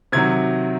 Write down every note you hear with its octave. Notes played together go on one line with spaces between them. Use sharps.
C3 D#3 F#3 G#6